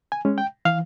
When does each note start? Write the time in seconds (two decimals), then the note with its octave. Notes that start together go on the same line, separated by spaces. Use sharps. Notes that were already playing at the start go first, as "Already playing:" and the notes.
0.12 G#5
0.25 G#3 C#4
0.38 G5
0.65 E3 F5